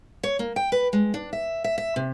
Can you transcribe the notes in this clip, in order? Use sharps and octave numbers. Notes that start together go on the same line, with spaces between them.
C#5
A#3
G5
B4
G#3
D4
E5
E5
E5
C3